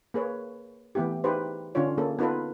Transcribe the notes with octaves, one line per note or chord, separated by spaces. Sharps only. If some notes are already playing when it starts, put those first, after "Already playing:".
A#3 G#4 B4 C#5
E3 A3 B3 E4 G4
D#4 E4 G4 G#4 B4 C5
D3 C#4 D4 F4 C#5
A#3 C#4 G#4 A4
B3 D#4 F4 A4 B4